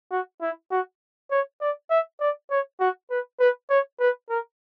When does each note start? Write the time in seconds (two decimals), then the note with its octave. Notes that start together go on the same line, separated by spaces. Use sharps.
0.11 F#4
0.41 E4
0.71 F#4
1.31 C#5
1.61 D5
1.90 E5
2.21 D5
2.51 C#5
2.80 F#4
3.11 B4
3.40 B4
3.70 C#5
4.00 B4
4.30 A#4